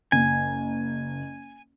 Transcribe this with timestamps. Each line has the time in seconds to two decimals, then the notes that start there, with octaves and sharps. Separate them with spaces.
0.12 F#1 G#5